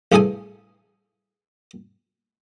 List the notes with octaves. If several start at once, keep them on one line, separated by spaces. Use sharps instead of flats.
A1 G2 E3 G#4 A4 G#5